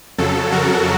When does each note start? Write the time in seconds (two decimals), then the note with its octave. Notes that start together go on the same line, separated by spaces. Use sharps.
0.18 F2 C#3 F#3 A4
0.52 F#4 A#4